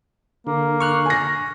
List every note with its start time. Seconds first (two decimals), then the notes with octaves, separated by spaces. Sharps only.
0.47 D3 A#3
0.80 C#6 F6 F#6
1.06 G#5 A#6